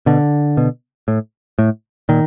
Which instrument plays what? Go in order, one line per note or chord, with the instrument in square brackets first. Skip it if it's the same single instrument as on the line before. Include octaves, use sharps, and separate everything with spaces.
[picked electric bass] B2 D3
B2
A2
A2
A#2 D#3